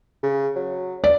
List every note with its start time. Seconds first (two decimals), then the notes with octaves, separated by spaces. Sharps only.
0.23 C#3
0.56 F#3
1.04 D5